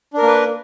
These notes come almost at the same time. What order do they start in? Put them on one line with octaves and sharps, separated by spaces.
D4 A#4 A#3 B4